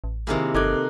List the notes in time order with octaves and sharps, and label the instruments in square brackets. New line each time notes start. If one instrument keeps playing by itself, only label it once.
[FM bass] A1
[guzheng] C3 D#3 A#3 [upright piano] E4 G#4
[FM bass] G1 [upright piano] D#4 D6 G#6 [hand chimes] A4 F#6